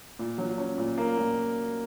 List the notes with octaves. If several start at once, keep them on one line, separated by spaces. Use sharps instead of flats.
A#2
F#3
C#4
A#2
A#3
A#2